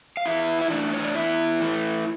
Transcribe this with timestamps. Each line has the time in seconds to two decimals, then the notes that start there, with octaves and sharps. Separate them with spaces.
0.17 F5
0.25 E2 E4 E5
0.61 E5
0.70 E3 A3 D4 D5
0.93 C#5
1.04 D5
1.15 E2 E4 E5
1.60 E3 A3